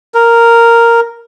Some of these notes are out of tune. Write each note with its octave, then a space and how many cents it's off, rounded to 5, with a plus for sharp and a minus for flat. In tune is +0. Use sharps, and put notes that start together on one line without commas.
A#4 -5